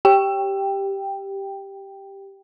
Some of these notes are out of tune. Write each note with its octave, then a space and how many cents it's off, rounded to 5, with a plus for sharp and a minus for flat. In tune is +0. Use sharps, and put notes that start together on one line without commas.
G4 +0 G5 +5